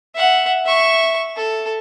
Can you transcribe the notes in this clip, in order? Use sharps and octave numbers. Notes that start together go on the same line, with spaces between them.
E5 F#5
E5 C#6
A4